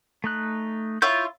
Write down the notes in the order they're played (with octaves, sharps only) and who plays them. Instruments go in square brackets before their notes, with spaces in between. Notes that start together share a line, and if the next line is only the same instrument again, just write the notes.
[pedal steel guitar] A3 D#4 F#6
[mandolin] E4 F4 C#5 [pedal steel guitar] C6 E6 G6